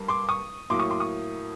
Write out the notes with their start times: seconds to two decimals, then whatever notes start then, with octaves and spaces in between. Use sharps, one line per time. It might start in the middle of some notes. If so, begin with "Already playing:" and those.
Already playing: G2 G3 A#3
0.08 C6 D6
0.29 C#6 D#6
0.70 A2 F#3 A#3 C6 D6
0.79 C#6 D#6
0.90 C6 D6
1.00 C#6 D#6